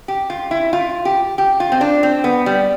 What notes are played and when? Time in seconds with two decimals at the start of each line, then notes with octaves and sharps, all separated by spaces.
0.08 G4
0.30 F4
0.51 E4
0.73 F4
1.05 G4
1.38 G4
1.60 F4
1.72 C4
1.81 D4
2.03 C4
2.24 B3
2.46 G3